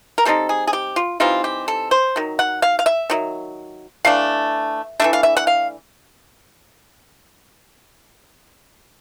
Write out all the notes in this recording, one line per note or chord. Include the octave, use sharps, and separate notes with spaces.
A#4
E3 G3 C4 D#4 A4
G#4
G#4
G4
F4
E3 G3 C4 D#4 F4
G4
A4
C5
D#3 F#3
F#5
F5
F5
E5
D#3 F#3
E3 A3 D4 F5
E3 A3 D4 E5
F5
E5
F#5
F5